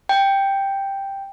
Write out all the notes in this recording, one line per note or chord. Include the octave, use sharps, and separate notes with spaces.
G5